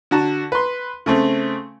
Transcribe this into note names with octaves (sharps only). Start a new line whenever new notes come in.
D3 F#4 A5
B4 C6
C#3 A3 C4